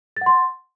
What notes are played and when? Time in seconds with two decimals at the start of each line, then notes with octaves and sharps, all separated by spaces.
0.16 A6
0.21 F#5
0.26 C6